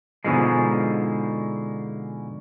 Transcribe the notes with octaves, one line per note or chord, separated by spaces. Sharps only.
G#2 B2 D3 F3 G#3